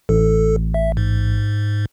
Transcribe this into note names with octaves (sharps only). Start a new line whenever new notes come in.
A1 A4
E5
G#2